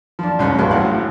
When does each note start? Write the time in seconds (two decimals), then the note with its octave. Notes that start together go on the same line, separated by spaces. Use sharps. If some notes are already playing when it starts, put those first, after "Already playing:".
0.19 F3 D4
0.39 C2 A2 G#3 C#4 F#4 F#6
0.58 A#1 G2 F#4 C6
0.71 G#1 A2 F#3 F5 F#5 F#6